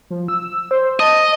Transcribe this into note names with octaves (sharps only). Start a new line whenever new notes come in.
F3
E6
C5
D#5 A5